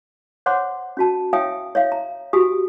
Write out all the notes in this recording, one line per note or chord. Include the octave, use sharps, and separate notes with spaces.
C5 C#5 F#5 C6 D6
C#4 F#4 A5
C#5 E5 F5 G5 G#5 D#6
C#5 E5 F5
A#5
F#4 G4 G#5 D#6